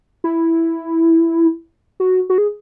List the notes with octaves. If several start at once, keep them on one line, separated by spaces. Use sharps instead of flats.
E4
F#4
F#4
G#4